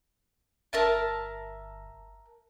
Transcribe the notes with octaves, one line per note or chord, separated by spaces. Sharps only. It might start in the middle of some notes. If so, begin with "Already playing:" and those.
G1 A#4 E5 A5